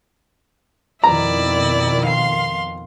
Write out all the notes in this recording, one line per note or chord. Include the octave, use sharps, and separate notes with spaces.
F2 B2 D#3 E4 D5 A#5
F5 C6